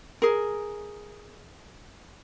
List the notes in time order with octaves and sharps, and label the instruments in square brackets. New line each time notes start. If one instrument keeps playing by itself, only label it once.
[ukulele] G#4 A#4